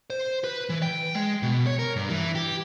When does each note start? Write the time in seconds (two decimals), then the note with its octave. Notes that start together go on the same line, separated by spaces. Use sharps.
0.10 C5
0.44 B4
0.70 E3
0.82 G5
1.15 G#3
1.43 B2
1.67 C#5
1.79 A#4
1.96 G2
2.10 E3
2.35 G4